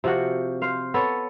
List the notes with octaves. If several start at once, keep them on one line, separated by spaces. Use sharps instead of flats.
C3 F3 F#4 F#5
C5 F5
B3 A4 C#5